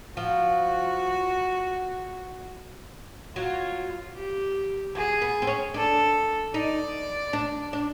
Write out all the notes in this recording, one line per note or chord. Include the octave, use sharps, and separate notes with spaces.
F3 F#4
F#3 F4
G4
F#3 G#4
B3
C4
C#4
D4 A4
D#4 D5
D4
D4